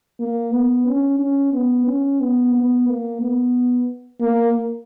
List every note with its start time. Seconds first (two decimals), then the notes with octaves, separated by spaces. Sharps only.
0.20 A#3
0.52 B3
0.86 C#4
1.19 C#4
1.53 B3
1.87 C#4
2.21 B3
2.54 B3
2.88 A#3
3.21 B3
4.21 A#3